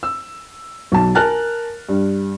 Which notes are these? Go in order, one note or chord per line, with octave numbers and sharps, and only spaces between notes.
E6
B1 A5
A#4 G#5 A5 F6 F#6 A6
G2